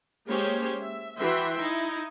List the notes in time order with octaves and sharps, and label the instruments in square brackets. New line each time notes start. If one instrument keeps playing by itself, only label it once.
[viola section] G#3 A#3 C#4 G4 C5 C#5
E5
E3 F#4 E5 G5 C6
D#4 E4